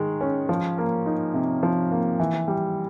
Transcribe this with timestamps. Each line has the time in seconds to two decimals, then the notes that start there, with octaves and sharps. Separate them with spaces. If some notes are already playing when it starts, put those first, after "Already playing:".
Already playing: D#3 G#3
0.21 C#4
0.49 F3
0.78 A#3
1.06 D#4
1.34 C3
1.63 F3
1.91 A#3
2.20 E3
2.48 G3